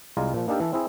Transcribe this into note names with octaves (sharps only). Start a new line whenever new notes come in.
C2 G#3 F4 D5 G#5 A#5
A#2 F3
A#3 D4 D#4 G4 A4 A#4
E3 A4
C4 E4 G#4